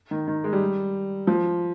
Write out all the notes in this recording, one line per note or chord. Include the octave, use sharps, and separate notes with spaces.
D#3
D#3
G#3
G3
F3